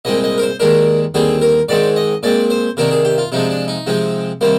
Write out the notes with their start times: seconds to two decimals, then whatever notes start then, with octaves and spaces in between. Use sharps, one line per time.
0.05 C2 A#2 G#3 C4 D#5
0.24 D#5
0.38 A#4
0.42 C5
0.60 D#2 D#3 G#3 D4 A#4
1.14 D#2 D3 G3 C4 G#4
1.41 A#4
1.69 G#2 D#3 G#3 C4 D5
1.96 D#5
2.23 A#2 G#3 C4 D5
2.50 C5
2.77 C3 D#3 A#3 D4 A#4
2.91 G#4
3.05 G4
3.18 F4
3.32 C3 F3 G#3 D4 D#4
3.51 D4
3.68 D#4
3.87 C3 F3 G#3 C4
4.41 C3 D#3 G3 A#3 C5